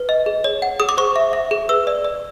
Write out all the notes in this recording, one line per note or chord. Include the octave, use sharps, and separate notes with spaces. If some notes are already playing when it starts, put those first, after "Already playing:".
Already playing: B4
D#5
G#4
C#5
F#5
G#4 D#6
D6
C5 C#6
E5
E5
G#4
B4 E6
D5
D5